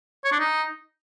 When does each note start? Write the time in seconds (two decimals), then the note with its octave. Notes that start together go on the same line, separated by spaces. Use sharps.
0.24 C#5
0.32 D4
0.39 D#4